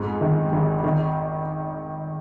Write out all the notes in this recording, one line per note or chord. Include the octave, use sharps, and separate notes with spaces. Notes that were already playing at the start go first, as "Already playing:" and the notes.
Already playing: F2 G#2
D#3
G#1
D#3